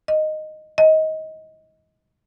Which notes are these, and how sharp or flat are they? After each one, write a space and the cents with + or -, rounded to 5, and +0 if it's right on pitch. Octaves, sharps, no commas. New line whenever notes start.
D#5 -5
D#5 +20